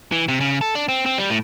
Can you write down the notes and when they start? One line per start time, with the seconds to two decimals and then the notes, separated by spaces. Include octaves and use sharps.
0.12 E3
0.28 C3
0.41 C#3
0.61 A4
0.75 D4
0.89 C4
1.06 C4
1.18 G3
1.30 A2